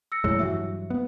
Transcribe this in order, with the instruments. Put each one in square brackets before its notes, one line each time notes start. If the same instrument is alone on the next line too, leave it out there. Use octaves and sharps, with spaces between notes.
[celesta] E6 A#6 C#7
[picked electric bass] F2 A#2 G#3 [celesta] E4 C#5 E6
[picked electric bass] G2 E3 F#3 [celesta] E5
[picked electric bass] B3